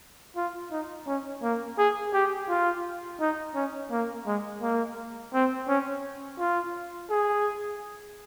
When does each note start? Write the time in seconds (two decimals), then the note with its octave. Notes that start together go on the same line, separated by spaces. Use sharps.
0.36 F4
0.71 D#4
1.07 C#4
1.42 A#3
1.78 G#4
2.13 G4
2.49 F4
3.20 D#4
3.55 C#4
3.91 A#3
4.26 G#3
4.62 A#3
5.33 C4
5.68 C#4
6.39 F4
7.10 G#4